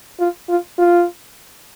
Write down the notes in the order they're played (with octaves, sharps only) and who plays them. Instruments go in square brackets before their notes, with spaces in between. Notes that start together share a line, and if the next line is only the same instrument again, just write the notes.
[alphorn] F4
F4
F4